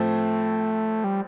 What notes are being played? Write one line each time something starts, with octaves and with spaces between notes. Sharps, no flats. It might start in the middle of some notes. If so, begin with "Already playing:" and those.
Already playing: A2 F3 A3 C4
G3